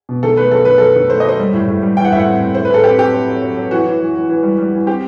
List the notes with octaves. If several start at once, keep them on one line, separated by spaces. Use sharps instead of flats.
B2
D#3 A4
A3 B4
F#3 A4
D#3 B4
F#3 A4
D#3
A3 C5
D#5
F#3 C5
G3
A2
A2
G3
E3 G5
F#5
A2 E5
F#5
C4
A2
A2 C5
B4
A2 A4
C4 G4
F#3 G4
C4
F#3
F#3
F#3
E3 F#4
E3
E3
E3
E3
G3
G3
E3
C4 G4